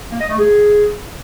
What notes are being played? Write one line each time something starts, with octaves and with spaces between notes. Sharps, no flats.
A#3
D#5
A3
G#4